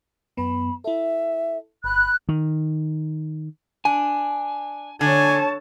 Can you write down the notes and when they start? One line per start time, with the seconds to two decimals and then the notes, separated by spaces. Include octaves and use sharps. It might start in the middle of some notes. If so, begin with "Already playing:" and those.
0.37 F#2 B3 B5
0.84 E4 A4 E5
1.84 G1 B5 F#6
2.29 D#3
3.85 D4 G#5
5.01 D3 C#5 G#5 A5